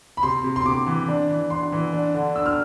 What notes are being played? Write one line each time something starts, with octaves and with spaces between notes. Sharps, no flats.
B5
C3 C6
C3
C6
C3 D6
E3
D4
E3
D4 C6
E3
D4
D3
D4 E6
F6